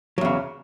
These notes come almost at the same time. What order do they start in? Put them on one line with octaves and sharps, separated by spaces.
F#3 E2 C#3